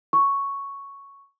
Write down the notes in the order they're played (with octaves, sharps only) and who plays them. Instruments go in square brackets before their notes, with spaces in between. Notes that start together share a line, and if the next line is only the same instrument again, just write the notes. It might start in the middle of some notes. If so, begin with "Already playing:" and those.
[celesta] C#6